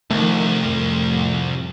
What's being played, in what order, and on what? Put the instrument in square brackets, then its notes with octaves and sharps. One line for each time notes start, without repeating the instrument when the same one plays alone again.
[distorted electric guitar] C2 [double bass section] D#3 F3 [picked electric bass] A3
[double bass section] F2 A2